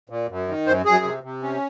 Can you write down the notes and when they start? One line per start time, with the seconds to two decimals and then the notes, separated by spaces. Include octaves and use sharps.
0.10 A#2
0.29 F#2
0.48 D#3
0.66 F#2 C5
0.85 F#2 G#4
1.04 C3
1.23 C3
1.43 C#4